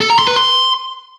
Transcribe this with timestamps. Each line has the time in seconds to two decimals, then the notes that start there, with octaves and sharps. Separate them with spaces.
0.01 A4
0.10 A#5
0.19 C6
0.28 B4
0.36 C6